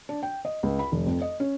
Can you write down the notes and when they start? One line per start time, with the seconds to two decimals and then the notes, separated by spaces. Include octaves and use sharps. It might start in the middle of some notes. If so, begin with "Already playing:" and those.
0.09 D4
0.23 G5
0.45 D#5
0.63 C#2
0.79 B5
0.92 F1
1.07 F2
1.21 D#5
1.40 C#4